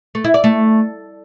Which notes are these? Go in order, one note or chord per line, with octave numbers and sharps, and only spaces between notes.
A3
E4
D5
A3